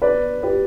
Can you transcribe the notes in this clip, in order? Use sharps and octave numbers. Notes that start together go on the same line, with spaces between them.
B4 D5
G4 B4